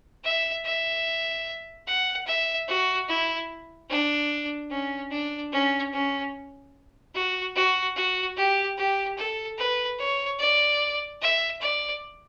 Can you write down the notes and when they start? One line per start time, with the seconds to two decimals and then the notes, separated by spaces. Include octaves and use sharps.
0.24 E5
0.65 E5
1.87 F#5
2.27 E5
2.68 F#4
3.09 E4
3.89 D4
4.71 C#4
5.11 D4
5.52 C#4
5.93 C#4
7.15 F#4
7.55 F#4
7.96 F#4
8.37 G4
8.78 G4
9.17 A4
9.58 B4
9.99 C#5
10.39 D5
11.21 E5
11.61 D5